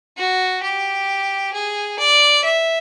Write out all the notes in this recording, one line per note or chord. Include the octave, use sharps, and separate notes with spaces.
F#4
G4
G#4
D5
E5